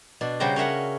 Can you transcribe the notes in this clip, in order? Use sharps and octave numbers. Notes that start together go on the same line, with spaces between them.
B2 D4
C#3 G3 F#4 C5 G5 A#5
C#4 A#4 E5 F#5